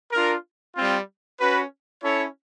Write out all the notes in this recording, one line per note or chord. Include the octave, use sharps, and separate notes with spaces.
D4 F4 A#4
G3 C4 F4
C#4 F#4 B4
C#4 E4 A4 C#5